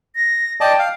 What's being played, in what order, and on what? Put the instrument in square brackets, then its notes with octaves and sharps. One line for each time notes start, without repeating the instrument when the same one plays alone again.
[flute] A#6
[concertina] D5 D#5 A5 [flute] G5
[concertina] F5